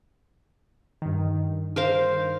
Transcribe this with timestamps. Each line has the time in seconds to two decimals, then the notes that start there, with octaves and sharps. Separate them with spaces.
1.02 G2 D#3
1.76 A#4 C5 F5